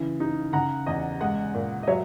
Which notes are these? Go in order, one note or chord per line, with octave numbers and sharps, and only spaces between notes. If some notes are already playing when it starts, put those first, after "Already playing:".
Already playing: C#3 E3
D#4
C#3 F#5 A#5
E2 D#5
G#3 D#5 F#5
A#2
D#5
F#3 C#5 E5